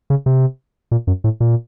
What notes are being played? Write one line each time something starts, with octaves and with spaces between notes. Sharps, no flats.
C#3
C3
A#2
F#2
A2
A#2